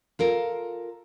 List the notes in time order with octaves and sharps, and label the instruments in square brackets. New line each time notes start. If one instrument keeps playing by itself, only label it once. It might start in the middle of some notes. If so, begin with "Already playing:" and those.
[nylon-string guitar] F4 A4 A#4